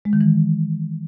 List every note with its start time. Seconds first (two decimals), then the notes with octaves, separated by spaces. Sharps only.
0.05 G#3
0.13 D#3
0.21 E3